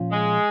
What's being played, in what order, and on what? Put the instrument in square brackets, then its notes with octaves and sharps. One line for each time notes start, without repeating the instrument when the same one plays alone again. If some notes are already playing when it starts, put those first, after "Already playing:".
Already playing: [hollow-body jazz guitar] A#2 F3 C#4 F4
[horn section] G#3